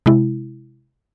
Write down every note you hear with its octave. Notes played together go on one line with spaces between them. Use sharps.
C3 G#3 E4